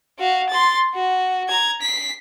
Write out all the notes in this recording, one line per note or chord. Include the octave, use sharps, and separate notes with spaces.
F#4 F5
C6 A6
F#4
A#5 G#6
B6 C7